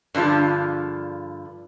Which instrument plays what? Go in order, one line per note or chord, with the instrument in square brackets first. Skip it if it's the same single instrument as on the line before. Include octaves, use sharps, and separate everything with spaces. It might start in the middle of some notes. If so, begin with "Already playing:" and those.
[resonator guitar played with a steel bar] G2 D3 F3 F4 G#4